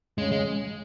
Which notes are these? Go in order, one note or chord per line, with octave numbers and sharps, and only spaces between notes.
C#3 G#3 C#4
G#3